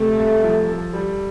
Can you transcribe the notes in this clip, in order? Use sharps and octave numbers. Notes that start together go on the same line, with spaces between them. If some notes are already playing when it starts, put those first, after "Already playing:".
Already playing: C3 A3
C2
F3
A4
G3